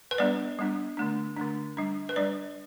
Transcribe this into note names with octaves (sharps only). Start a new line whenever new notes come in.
B4
G3 B3 D4 D5
G3 B3 D4
D3 A3 D4
D3 A3 D4
G3 D4
B4
G3 D4 D5